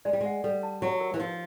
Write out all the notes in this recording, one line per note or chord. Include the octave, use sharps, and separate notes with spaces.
G#3 D5
G3
G#3 F#5
G3 A4
A5
F#3 G4
A#4
E3
F3 D#4